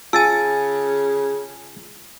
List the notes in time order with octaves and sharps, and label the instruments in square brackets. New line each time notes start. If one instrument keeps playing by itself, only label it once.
[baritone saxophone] C#3 [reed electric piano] F4 [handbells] G#5 A5 [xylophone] E6 A6 D#7